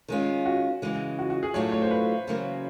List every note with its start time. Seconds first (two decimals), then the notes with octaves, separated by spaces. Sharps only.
0.08 D#3 G#3 C#4 F4
0.46 F#4
0.82 C#3 E3 G#3
1.19 F#4
1.30 F#4
1.43 G#4
1.54 A2 F#3 A3 D4 F4 C#5
1.72 C#5
1.82 C5
1.91 B4
2.27 E2 C#3 F#3 A#3